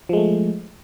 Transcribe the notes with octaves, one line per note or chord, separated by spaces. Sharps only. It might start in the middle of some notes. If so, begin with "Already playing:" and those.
F3 G#3 A3